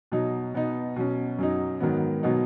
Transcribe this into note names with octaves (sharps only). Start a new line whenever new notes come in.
B2 F#3 D#4
B2 B3 D#4
B2 F#3 C#4
F#2 F#3 D#4
G#2 D#3 F#3 B3
B2 F#3 B3 D#4